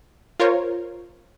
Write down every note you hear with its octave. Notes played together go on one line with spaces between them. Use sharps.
F4 A#4 C5 C#5